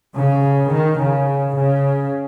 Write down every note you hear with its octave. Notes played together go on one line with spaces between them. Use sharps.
C#3
D#3
C#3
C#3